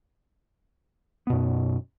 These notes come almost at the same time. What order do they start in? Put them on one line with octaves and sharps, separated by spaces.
B3 B2 F#2